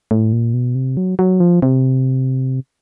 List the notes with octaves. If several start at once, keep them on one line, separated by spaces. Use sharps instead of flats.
A2
A#2
B2
C3
F#3
F#3
F3
C3